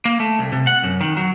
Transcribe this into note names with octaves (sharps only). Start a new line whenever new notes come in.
A#3
A3
C2
C3
F#5
F#2
D#3
F#3